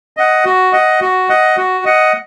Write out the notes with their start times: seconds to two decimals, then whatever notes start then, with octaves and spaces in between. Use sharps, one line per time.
0.17 D#5 F#5
0.45 F#4
0.72 D#5 F#5
1.01 F#4
1.29 D#5 F#5
1.57 F#4
1.85 D#5 F#5